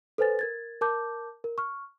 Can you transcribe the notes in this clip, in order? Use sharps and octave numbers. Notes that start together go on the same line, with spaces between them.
A4 B4 C5 G#5 A6
A#4 G#6 A6
A#4 A5 D6 G6
A#4
C#6 F6